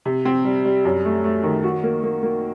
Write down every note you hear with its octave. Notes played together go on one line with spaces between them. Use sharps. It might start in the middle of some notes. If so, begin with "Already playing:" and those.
C3
C4
G3
G3
F#2
A3
A3
D#3
F#4
A#3
A#3
A#3